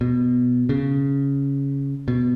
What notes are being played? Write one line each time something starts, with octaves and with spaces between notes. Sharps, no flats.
B2
C#3
B2